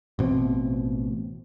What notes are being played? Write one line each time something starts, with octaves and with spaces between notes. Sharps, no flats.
A1 B2 C4